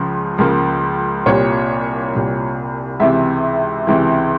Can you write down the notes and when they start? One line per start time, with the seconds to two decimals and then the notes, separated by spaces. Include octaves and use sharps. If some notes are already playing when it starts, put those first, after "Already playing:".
Already playing: C#2 C#3 F3
0.38 C#2 C#3 F3 A#3
1.26 C2 A#2 G3 C#5
2.14 C2 A#2 G3
3.00 C#2 C3 E3 E5
3.87 C#2 C3 E3